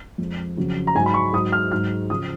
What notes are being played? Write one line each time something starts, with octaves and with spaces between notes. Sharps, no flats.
F2 F3 G#3
F2 C#3 F#3
A#5
G#2 F#3 G#5
B5
C#6
G#2 F#3 D#6
F6
G#2 F#3 F6
C#3 F3 D#6